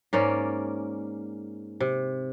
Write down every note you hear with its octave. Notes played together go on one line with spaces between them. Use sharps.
G#2 A#3 C#4 D5
C3